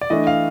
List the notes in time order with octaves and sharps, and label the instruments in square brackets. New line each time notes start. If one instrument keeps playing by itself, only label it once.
[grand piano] D5
[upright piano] E3 A3 D4 [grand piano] D#5
[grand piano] F5